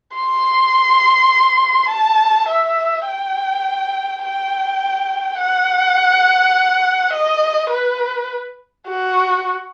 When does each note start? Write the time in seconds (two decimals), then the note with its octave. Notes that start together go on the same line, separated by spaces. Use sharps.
0.16 C6
1.90 A5
2.49 E5
3.06 G5
4.23 G5
5.38 F#5
7.13 D#5
7.71 B4
8.88 F#4